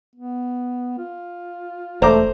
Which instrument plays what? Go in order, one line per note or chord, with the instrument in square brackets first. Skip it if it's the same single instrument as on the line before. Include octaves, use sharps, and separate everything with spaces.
[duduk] B3
F4
[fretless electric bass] E1 [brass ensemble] A3 [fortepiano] C5 A#5 D6